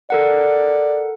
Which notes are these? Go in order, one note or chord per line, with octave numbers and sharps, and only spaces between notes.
A4 A#4 D5 F#5